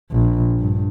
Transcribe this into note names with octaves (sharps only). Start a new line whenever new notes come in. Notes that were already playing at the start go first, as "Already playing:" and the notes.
A#1
G2